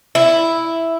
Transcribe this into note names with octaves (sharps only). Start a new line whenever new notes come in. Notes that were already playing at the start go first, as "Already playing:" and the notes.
E4